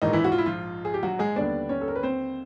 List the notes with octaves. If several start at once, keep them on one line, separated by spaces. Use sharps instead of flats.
A#1 G#2 D#3 E3 D#4
E3 E4
F#4
F4
E4
F3 F4
G#4
G4
F#3 F#4
G#3 G#4
D#2 D3 G3 B3 D4 D5
C#4 C#5
A4
A#4
B4
C4 C5